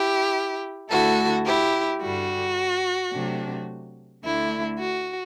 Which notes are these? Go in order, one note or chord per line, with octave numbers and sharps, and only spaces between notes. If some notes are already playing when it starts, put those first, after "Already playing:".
Already playing: E4 G4
D2 D3 A3 E4 F#4 A4
E4 G4
G2 D3 G3 F#4
C3 F#3 A3 D4
D2 D3 A3 D4 E4
F#4